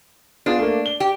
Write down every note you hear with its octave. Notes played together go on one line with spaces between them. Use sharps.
B3 D4 F4 G#4
A3 A#3
G7
G4